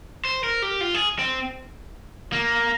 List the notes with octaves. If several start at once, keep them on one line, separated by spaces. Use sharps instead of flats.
C5
A#4
G4
F4
G#4
C4
A#3